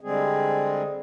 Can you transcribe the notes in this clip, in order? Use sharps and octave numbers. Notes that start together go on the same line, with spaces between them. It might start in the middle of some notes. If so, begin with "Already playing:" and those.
D3 G3 G#3 C4 G#4